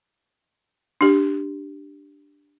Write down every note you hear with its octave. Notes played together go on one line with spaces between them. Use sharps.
D4 G4